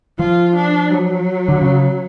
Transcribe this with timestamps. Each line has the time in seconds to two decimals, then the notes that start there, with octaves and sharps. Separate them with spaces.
0.19 F3 F4
0.55 D4
0.90 F#3
1.48 D3
1.62 C#3